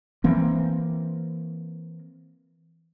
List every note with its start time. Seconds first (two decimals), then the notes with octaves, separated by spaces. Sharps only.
0.24 E3 A#3 C4